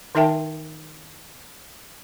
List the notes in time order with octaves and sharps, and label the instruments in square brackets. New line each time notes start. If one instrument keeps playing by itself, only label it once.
[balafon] D#3 D#4 A#4 E5 G5 A5